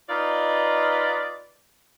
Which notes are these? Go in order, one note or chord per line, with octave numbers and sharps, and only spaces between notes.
D#4 F4 B4 D5 D#5